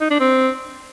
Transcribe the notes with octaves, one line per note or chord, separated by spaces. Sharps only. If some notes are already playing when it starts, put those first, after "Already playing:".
D#4
D4
C4